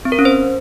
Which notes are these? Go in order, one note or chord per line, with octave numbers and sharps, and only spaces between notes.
C4
A#4
C#4
C5